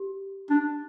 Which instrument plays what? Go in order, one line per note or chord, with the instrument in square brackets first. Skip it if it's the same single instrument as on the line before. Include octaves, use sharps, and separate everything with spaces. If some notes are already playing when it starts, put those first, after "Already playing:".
Already playing: [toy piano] G4
[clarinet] D4